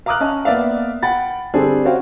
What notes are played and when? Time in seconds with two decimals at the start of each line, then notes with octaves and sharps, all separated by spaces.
0.06 F5 A#5 D6 D#6 F6 F#6
0.20 C#4 D#5 A5
0.45 A#3 B3 D5 E5 F5
1.03 F#5 G5 B5 A6
1.54 D3 G3 C4 D4 G#4 A4
1.85 C#4 F#4 C5 C#5 F5 G5